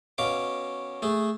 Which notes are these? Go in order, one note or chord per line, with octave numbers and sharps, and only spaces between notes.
B2 C#4 F5 D6
A3 G#4